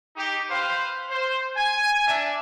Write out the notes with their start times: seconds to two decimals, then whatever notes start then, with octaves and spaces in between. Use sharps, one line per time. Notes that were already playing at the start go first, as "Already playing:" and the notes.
0.16 D#4 G4
0.50 B4 C5 F5
1.10 C5
1.57 G#5
2.07 D4 E5